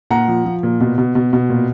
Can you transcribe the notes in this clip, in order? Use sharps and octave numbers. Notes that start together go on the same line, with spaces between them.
A#2 F#5 A#5
F3
F3
A#2
B2
B2
B2
B2
A#2